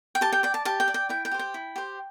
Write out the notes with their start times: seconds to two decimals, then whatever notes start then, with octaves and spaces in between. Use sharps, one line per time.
0.15 G5
0.21 G4 A5
0.32 G5
0.43 D5 G5
0.54 A5
0.65 G4 A5
0.80 G5
0.88 D5
0.94 G5
1.09 E4 G5
1.25 G5
1.31 G4 C5
1.39 G5
1.54 E4
1.76 G4 C5